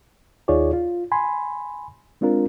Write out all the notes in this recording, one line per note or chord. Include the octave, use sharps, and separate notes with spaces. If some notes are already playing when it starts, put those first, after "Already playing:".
D#2 D#4 F4 G#4 C#5 D5
F4
G#5 B5 C6
G#3 C4 D4 F4 A#4